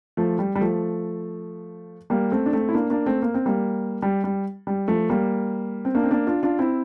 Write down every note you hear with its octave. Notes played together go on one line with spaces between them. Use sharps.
F3 A3
G3
G3
F3 A3
G3 A#3
A3 C4
D4
A3 C4
E4
A#3 D4
A#3 D4
A3 C4
A#3
C4
G3 A#3
G3
G3
G3
F3 A3
G3 A#3
C4
A#3 D4
C4
A#3 D4
D4 F4
D4 F4
C4 E4